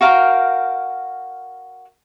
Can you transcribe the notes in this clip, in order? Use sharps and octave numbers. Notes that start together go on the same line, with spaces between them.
F#4 A#4 F5 G5